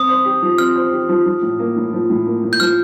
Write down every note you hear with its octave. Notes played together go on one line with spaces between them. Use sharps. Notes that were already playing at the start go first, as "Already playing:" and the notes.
Already playing: C4 D#6
C5
G4
F3
C4 F6
C5
G4
F3
F3
A2
A#3
A2
F3
A2
A#3
A2
G6
F3 F6